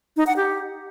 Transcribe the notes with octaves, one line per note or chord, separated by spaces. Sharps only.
D#4
F#5
G4